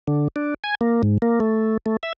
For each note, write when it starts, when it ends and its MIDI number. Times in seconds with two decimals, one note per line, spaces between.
0.08 0.28 50
0.36 0.54 62
0.64 0.75 80
0.81 1.02 58
1.03 1.18 44
1.22 1.39 58
1.40 1.77 57
1.86 1.97 57
2.03 2.13 76